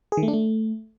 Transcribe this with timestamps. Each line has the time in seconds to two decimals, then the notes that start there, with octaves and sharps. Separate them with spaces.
0.12 G#4
0.17 D#3
0.23 A3
0.28 D4
0.33 A3